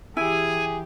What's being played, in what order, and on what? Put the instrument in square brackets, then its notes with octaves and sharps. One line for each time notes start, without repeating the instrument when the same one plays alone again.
[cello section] E3 G4 [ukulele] E4 [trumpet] G#4 [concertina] G#5